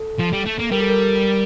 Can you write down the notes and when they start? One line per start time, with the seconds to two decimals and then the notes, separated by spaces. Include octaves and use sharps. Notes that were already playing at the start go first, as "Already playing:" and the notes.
Already playing: A4
0.19 F3
0.33 G3
0.46 A3
0.59 A#3
0.71 G3 A#4
0.81 A4
0.90 A#4